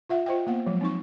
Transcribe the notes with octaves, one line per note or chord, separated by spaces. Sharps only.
F4 E5 F#5
F4 C5 D#5 G5
A#3 B3 F#5
F3 F#3 G#3
C4 D#4 C#6